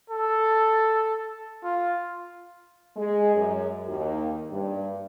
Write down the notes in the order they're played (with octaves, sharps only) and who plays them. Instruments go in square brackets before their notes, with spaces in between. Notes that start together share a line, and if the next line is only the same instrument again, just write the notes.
[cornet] A4
F4
[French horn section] G#3
F#2
D#2
G2